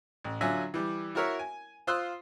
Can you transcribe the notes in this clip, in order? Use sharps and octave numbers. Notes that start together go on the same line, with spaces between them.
A1
D3 F#3 F4 E5 G#5
E3 G3
E4 F#4 A#4 C#5 E5
G#5
F4 C5 C6 D#6 E6 F#6